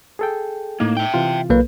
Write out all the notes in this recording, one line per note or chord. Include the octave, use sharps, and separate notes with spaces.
G#4 A4 G5
A2 A#3 D#4
E5 G5
C3 E3 F4
B1 A#3 B4